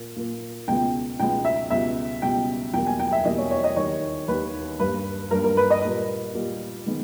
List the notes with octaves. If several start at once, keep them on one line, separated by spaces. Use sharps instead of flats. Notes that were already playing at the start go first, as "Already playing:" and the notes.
Already playing: A#2 A#3
A#2 A#3
C#2 B2 G#3 B3 G5
C#2 B2 G#3 B3 G5
E5
C#2 B2 G3 E5
C#2 B2 G3 G5
E2 B2 G3 A#3 G5
G#5
G5
E5
E2 B2 G3 A#3 D#5
C#5
C#5
D#5
D#2 D#3 G3 A#3 C#5
D#2 D#3 G3 A#3 B4
G2 G3 A#3 B4
G2 G3 A#3 A#4
A#4
B4
D#5
A#2 G3 A#3
A#2 G3 A#3
D#3 G#3 B3